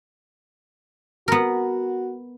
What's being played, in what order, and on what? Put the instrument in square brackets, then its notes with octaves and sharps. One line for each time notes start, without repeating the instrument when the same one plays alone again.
[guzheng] B3 A#4 [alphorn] F#4